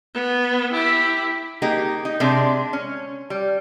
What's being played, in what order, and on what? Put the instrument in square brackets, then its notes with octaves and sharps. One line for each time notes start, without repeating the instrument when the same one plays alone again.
[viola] B3
[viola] E4 [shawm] G4
[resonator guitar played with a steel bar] A#3 D#4 G4 G#4
D#4
C3 G#3 D4
C#4
G3